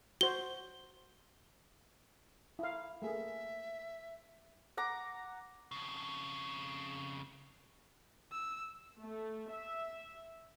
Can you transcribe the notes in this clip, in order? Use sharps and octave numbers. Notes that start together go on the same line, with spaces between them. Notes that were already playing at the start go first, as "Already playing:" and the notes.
F#4 C5 G7
E4 F5
A3 A#3 G#4 E5
F#5 A#5 D6
F2 C#3
E6
A3
E5